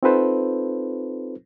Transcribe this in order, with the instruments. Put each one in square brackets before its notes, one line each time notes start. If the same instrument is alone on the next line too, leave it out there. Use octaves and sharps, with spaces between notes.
[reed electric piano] C4 D#4 F4 A4 B4 C5